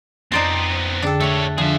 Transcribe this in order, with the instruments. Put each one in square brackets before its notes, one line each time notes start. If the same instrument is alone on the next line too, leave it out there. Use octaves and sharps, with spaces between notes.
[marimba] F2 C6 [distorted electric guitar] B3 C4 [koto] D#4 D5 A5
[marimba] D3 G#4 G5 [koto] D4 A4
[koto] A3 F#5 [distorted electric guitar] A4 C#5
[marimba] D3 D4 [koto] F3 [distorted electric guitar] G#4 E5